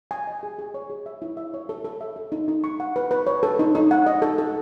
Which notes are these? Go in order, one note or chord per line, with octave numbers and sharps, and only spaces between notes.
G#5
D#5
G#4
G#4
C#5
G#4
E5
E4
E5
C#5
A4
A4
E5
A4
D#4
D#4
C#6
F#5
B4
B4
C#5
A4
D#4
D#4
F#5
D#5
A4
A4